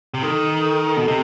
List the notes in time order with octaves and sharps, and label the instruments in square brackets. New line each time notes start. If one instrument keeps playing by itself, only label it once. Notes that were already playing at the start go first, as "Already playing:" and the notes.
[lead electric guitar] C3
[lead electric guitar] D#3 [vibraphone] A4
[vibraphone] A4
[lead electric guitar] B2
[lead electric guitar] C3 [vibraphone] A4